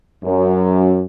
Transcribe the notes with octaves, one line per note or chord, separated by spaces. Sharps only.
F#2